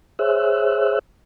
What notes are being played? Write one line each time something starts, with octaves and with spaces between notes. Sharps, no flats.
G#4 C5 C#5 E5 E6 F#6